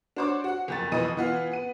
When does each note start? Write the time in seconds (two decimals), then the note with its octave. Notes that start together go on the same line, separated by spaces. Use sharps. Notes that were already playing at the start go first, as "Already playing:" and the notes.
0.16 D4 F#4 C5 C#5 D6
0.44 F#4 F#5
0.68 F#1 F2 A6
0.92 F2 B2 E3 D#5 D#7
1.17 E3 B3 F4
1.52 B3 D#7